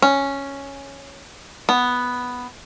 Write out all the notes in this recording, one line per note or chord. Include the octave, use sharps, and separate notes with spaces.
C#4
B3